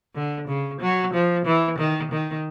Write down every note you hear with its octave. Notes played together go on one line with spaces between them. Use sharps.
D3
C#3
F#3
F3
E3
D#3
D#3